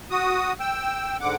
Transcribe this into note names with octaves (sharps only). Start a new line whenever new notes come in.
F#4 D#6
G5 E6
G#2 D3 F#5 D6